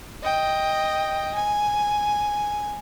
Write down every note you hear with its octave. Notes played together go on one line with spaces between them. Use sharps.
D#5 G5
G#5